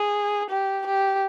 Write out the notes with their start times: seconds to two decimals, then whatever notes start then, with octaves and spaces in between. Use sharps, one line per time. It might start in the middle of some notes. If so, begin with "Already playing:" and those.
Already playing: G#4
0.50 G4
0.86 G4